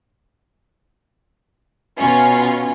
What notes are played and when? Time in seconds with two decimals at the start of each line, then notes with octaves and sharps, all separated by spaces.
1.98 B2 C#4 F4